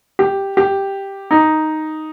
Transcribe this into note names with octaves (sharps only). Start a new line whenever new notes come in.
G4
G4
D#4